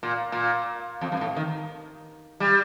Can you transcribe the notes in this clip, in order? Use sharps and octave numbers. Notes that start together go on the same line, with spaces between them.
A#2
A#2
F2
G2
A2
D#3
G3